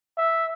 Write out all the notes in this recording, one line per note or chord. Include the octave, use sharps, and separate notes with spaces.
E5